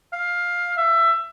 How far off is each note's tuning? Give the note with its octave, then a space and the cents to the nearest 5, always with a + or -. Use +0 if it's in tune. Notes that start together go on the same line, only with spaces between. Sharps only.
F5 +15
E5 +20